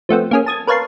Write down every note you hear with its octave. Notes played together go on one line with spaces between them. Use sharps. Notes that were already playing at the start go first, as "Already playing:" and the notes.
F3 A3 B3 C4
A#3 C#4 G#4
A5 D#6 G#6
A#4 B4 C#5 F5 A5 C6